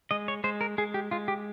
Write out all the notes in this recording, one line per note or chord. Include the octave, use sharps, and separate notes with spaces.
G#3 D#5
C#5
G#3 C5
A#4
G#3 G#4
G4
G#3 F4
G4